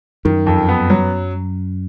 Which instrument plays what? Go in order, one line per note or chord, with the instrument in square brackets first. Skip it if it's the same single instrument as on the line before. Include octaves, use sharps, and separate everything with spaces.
[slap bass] F#2 [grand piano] D#3
[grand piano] F2
B3
F#3